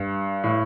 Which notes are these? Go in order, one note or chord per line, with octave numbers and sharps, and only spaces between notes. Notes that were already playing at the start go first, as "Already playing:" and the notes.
Already playing: G2
A2